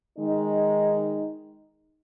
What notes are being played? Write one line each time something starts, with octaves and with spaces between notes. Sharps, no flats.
D#3 G#3 D#4